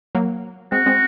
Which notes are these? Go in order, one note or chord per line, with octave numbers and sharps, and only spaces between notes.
F#3 A#3
G#3 C4 F#4
G#3 C4